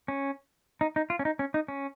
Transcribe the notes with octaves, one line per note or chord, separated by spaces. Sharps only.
C#4
D#4
D#4
F4
C#4
D#4
C#4
D#4
C#4